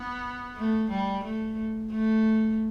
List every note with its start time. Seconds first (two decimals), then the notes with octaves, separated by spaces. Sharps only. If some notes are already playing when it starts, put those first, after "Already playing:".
Already playing: B3
0.57 A3
0.90 G3
1.24 A3
1.91 A3